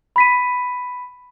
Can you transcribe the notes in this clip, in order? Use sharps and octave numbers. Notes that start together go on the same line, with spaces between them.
B5 B6 D#7